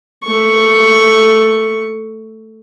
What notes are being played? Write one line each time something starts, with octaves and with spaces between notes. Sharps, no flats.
A3 C#6